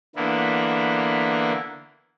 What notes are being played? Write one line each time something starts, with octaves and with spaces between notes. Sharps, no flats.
D3 E3 A#3 B3 E4